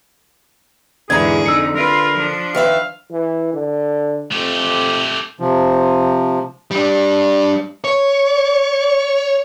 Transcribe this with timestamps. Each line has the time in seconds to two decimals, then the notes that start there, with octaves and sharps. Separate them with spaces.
1.10 E2 G#2 D3 G#4 A#5 G#6
1.46 F2 D#4 E6 C#7
1.75 F4 A#4 B4
2.16 F3 D4
2.55 D#3 B4 E5 F5
3.11 E3
3.53 D3
4.32 F2 A3 G4
5.40 C3 F3
6.71 G3 D4
7.84 C#5